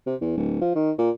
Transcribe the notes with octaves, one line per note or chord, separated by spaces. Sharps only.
C3
E2
D1
F3
D#3
A#2